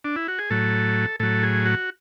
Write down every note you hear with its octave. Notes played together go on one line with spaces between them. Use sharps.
D4
E4
F#4
G#4
A2 F#3 A4
A2 F#3 A4
G#4
F#4